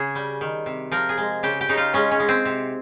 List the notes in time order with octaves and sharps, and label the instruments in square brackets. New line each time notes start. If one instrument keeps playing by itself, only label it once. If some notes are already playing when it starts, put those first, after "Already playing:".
Already playing: [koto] C#3 G#4
G3
D#3
C3
F3 A#4
G#4
G#3
C#3 G4
G4
C#3 D#4
F4
G#3 C#4
C#4
G#3
C4
C3